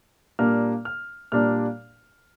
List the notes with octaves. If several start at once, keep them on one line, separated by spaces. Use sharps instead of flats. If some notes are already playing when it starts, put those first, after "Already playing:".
A#2 G3 A#3 D4 F6
F6
A#2 G3 A#3 D4 F6